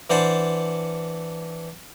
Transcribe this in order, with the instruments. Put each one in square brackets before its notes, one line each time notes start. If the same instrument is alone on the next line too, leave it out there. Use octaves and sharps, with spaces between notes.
[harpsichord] E3 D4 C5 F#5 A5